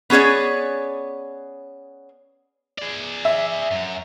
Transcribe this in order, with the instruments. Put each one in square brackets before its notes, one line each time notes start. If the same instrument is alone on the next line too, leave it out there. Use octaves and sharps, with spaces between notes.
[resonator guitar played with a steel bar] B3 C#4 G#4 C#5 D5
[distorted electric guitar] G#4 D5
[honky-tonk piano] E5
[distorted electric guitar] F#2